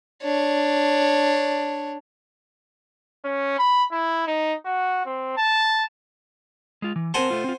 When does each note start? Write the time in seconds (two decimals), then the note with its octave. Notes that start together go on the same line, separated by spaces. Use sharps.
0.22 D4 C#5
3.24 C#4
3.59 B5
3.92 E4
4.27 D#4
4.65 F#4
5.06 C4
5.37 A5
6.82 G#3 F4
6.96 E3
7.14 C4 A#4 C5 F#5 G#5 A5
7.30 A3 F4
7.44 C4 F4